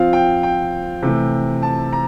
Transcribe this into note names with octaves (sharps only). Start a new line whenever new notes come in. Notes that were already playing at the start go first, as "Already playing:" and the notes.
Already playing: F3 C4 F4 F5
G5
G5
C3 E3 A3
A5
A#5